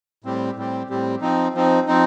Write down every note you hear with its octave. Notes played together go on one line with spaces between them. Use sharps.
A2 G3 C4 G4
A2 G3 C4 G4
A2 G3 C4 G4
F3 C4 D#4
F3 C4 D#4
F3 C4 D#4